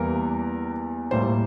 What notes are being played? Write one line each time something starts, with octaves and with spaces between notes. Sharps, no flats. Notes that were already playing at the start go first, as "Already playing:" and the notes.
Already playing: E2 E3 G3 A#3 A#4
A2 G3 A#3 C5